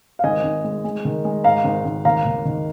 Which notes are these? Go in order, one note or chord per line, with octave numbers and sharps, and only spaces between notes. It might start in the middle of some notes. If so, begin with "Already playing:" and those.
F5
G#1 D#5 G#5
G#1
G#3
G#3
D#3
G#3
G#2 F5 A#5
G#1
G#1
D#2 F5 A#5
D#2
D#3